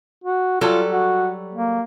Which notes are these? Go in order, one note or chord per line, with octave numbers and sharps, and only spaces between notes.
F#4
F#3 G3 F4 A4
F#4
A#3